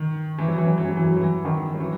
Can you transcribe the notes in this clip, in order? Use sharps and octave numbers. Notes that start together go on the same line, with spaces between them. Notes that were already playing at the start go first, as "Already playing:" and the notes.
Already playing: D#3
E3
F#3
E3
F#3
E3
F#3
E3
F#3
E3
D#3
F#3
E3